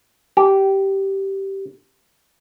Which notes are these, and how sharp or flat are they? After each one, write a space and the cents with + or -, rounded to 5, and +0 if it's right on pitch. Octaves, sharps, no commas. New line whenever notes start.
G4 -10